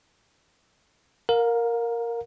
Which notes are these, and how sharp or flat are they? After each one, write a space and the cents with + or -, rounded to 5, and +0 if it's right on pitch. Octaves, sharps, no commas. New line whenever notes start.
A#4 +0 F5 +35